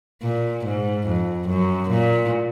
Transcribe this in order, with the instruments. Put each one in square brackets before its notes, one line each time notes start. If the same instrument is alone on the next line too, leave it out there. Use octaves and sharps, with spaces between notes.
[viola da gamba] A#2
G#2
F2
F#2
A#2